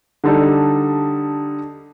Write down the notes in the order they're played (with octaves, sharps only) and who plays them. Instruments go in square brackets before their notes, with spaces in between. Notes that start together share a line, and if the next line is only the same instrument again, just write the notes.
[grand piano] D3 G3 D#4 A4 D5